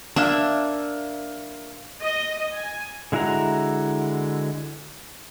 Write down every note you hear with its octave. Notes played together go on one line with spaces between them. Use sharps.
A#3 D4 E5 E6
D#5
G#5
D3 G#3 E4 F#4 A#5